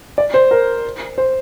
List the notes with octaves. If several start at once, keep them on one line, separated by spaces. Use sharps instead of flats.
D5
C5
A#4
C5